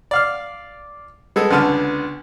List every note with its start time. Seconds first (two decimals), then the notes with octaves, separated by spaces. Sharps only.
0.11 D5 F5 F6
1.36 G#3 B3 G#4 A4
1.51 C#2 D3 B3 A5 F6